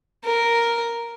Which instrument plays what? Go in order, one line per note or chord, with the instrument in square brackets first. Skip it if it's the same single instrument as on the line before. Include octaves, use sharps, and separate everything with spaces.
[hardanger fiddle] A#4